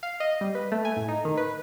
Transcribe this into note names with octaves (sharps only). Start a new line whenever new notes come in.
F5
D#5
G3
B4
A3
G#5
A2
D#4
D#3
B4